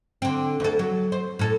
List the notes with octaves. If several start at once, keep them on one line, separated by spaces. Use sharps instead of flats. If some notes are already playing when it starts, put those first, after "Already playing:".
D3 C4
D2 A4
F#3
C5
A2 A4